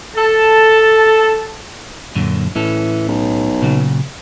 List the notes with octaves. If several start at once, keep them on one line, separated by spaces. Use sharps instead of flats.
A4 A5
F#2 A#2 D3
A2 E3 C#4 A4
B1
A#2 C#3 F#3